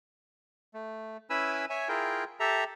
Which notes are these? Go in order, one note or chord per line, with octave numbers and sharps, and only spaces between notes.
A3
C#4 E4 B4 G#5 B5 E6
C#5 E5 G#5
E4 F4 G#4 A#4 G5
G4 A4 E5 A#5